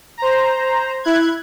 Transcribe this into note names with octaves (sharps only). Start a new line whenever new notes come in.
C5 A#5
E4 F#6 G#6